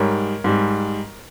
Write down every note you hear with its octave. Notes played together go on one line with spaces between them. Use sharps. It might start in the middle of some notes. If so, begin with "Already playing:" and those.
Already playing: G#2 G3 A#4 C#5
G#2 G3